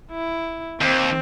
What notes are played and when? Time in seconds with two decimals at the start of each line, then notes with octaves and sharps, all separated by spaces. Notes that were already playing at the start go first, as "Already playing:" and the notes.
0.11 E4
0.81 D#2 C4